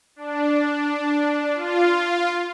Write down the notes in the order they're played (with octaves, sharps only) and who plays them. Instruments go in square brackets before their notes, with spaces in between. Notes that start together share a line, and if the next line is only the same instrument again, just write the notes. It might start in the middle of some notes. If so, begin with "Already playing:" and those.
[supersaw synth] D4
F4